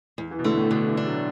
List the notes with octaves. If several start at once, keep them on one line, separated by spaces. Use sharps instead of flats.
E2
E3
B2
D3 A3
A2
B2 D3
E3
D4
F#3